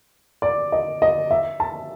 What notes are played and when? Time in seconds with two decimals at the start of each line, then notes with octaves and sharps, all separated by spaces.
0.42 D5
0.72 D#5
1.02 D#5
1.31 E5
1.60 A5